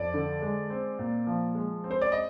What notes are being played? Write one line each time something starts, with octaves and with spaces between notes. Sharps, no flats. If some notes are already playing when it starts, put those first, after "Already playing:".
Already playing: F2 D5
D3
G#3
C4
A#2
F3
G#3
C4
C5
D5
D#5